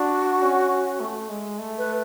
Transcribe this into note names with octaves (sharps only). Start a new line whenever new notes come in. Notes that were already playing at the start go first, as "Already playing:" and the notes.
Already playing: D4 F#4
C#4
A3
G#3
A3
B4